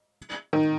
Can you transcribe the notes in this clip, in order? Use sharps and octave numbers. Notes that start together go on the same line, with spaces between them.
D#3